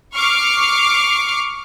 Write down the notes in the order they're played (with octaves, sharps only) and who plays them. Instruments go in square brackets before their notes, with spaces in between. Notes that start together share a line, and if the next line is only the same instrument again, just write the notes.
[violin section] C#6 D6 F6 C7